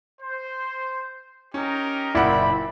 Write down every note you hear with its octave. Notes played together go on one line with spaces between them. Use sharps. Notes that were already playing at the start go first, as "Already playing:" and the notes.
C5
C#4 D#4 G4 A#4
F#1 A#2 C4 E4 D5 F#5 B5